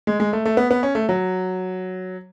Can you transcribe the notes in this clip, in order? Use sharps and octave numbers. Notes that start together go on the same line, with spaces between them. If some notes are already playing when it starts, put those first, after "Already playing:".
G#3
G#3
A3
A3
B3
B3
C#4
A3
F#3